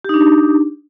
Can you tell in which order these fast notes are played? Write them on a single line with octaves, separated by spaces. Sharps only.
G4 D#4 D4